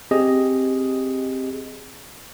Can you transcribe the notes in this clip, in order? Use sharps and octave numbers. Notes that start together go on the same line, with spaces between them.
C4 G4 G#4 D#5